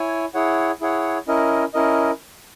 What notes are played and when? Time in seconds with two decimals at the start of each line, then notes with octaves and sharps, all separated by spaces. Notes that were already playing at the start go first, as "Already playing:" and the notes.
Already playing: E4 C#5 G#5
0.34 E4 G#4 C#5 F#5
0.81 E4 G#4 C#5 F#5
1.28 C#4 E4 A#4 D#5
1.74 C#4 E4 A#4 D#5